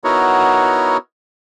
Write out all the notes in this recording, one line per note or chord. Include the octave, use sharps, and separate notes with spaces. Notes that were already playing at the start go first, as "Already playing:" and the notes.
B3 D#4 E4 F#4 A#4 C#5